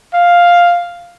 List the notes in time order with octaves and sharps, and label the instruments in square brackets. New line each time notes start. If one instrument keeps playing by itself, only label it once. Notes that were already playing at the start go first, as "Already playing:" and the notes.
[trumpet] F5